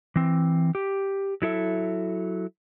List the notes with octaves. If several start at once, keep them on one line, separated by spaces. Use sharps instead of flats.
E3 C4
G4
F#3 E4 A4 E5